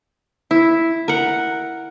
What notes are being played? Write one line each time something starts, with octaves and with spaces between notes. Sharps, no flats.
E4
A#4 F#5